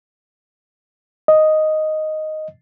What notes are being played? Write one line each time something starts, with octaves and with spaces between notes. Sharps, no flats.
D#5